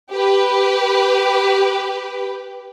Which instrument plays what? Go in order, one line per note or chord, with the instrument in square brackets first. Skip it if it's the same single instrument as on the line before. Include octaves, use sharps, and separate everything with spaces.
[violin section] G4 B4